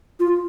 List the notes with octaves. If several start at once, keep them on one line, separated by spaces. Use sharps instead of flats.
F4